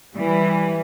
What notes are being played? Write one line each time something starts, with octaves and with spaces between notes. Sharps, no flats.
E3 G3